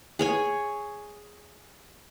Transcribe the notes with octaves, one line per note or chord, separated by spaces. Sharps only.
G#4 C#5 G#5